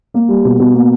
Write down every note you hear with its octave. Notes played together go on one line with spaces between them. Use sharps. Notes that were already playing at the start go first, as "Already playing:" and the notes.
A#3
G3
B2
B2
A#3